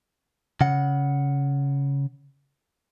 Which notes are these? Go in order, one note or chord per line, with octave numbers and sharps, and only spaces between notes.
C#3 F#5